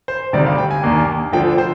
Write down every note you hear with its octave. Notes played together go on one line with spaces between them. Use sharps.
C5
D2 C3 D#3 G3 D5
F5
G5
G#5
D#2 D#3 A#3 D4
D2 D3 F3 G5
C5